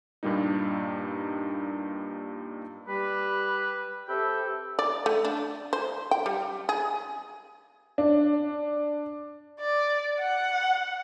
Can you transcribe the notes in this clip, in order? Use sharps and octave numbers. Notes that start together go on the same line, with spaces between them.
G2 A#2 G3 A#3 D#4
G3 B4
C4 G4 A4 B4 E5 G5
D5
A3
D4
C5
G5
G3
G#4
D4
D5
F#5